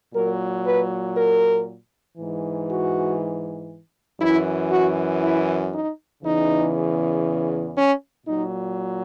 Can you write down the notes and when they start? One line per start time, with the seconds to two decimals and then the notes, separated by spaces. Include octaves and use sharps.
0.14 A#2 F#3 A#4
0.65 B4
1.15 A#4
2.18 G#2 E3
2.68 F#4
4.20 F#2 E3 E4
4.71 F#4
5.22 E4
5.73 D#4
6.23 E2 C#3 E3 D#4
7.76 C#4
8.27 A#2 F#3 D#4